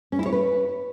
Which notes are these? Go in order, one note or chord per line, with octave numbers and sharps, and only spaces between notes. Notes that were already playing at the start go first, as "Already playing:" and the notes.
C#4
E4
C#5
B4